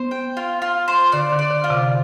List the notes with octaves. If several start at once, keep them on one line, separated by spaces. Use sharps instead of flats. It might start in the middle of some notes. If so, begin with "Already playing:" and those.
Already playing: B3 C5
G5
F4
F4
C5
D3 D5
D3
D5
D3
F4
C3